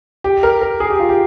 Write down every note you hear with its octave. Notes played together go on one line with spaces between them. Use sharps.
G4
A#4
A#4
G#4
G4
F4
G4